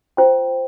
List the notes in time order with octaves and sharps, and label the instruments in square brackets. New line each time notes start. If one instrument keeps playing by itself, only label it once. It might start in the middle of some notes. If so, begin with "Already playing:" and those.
[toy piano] F4 C5 G5